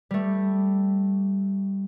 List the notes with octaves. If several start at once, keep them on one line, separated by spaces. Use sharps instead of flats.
G3 A3